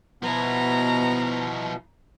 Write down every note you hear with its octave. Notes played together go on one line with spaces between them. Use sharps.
B2 F3 B3 E4 A#5